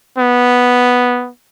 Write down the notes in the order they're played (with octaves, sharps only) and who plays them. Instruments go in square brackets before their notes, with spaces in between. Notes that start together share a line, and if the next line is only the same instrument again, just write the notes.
[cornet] B3